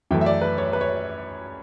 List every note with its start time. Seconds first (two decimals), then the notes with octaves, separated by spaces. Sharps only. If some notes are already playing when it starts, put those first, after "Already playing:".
0.11 F#2 E3 A3 G5
0.21 E5
0.26 D5
0.42 B4
0.58 C#5
0.73 B4
0.81 C#5